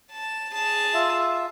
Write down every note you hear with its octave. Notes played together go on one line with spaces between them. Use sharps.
A5
G#4 A5
F4 E5